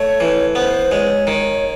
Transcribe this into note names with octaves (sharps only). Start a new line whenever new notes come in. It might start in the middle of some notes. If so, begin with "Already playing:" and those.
Already playing: A3 C#5
E3
B3 C5
G#3 C#5
D#3